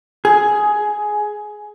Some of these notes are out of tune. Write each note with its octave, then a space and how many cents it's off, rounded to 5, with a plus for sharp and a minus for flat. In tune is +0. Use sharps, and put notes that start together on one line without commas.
G#4 +10